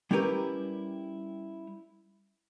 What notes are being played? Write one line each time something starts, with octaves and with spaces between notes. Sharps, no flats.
G3 C#4 E4 G4 A#4 B4